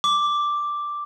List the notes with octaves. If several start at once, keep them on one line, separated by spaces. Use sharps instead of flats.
D6